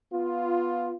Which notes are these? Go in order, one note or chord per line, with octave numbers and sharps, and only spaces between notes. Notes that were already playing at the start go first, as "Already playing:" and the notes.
B3 F4